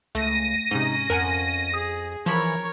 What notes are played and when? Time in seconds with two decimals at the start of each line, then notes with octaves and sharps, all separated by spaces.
0.15 C#2 A3 A#6 D#7
0.71 G#2 C3 C#4 D#4
1.10 F2 A#4 F#5 G#5
1.74 G#4 D#6 A#6
2.26 E3 F3 A#4 C#5 B5